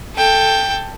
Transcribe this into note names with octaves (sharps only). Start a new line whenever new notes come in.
A4 G5